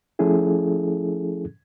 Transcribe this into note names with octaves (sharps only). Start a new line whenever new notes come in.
F3 A3 C#4 E4 G#4 A4